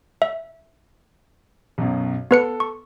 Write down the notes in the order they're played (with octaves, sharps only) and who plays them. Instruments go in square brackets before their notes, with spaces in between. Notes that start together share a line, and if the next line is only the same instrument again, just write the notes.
[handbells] E5
[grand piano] B1 F#2 B2
[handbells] B3 B4 C#7 [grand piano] A4
[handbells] C#6